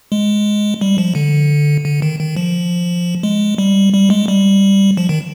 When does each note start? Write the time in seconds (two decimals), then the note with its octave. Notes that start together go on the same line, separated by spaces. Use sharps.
0.12 G#3
0.81 G3
0.98 F3
1.15 D3
1.85 D3
2.02 D#3
2.20 D#3
2.37 F3
3.23 G#3
3.58 G3
3.94 G3
4.10 G#3
4.28 G3
4.97 F3
5.09 D#3